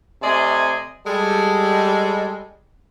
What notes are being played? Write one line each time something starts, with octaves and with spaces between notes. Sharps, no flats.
C3 A3 D5 D#5 G#5 C6
G3 G#3 A4